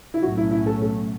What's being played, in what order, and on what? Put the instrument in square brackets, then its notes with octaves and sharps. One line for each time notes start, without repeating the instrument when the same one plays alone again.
[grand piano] E4
[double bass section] B1 A2 F#3 A3 C#4 [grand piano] F#4
[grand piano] E4
E4
A4
A4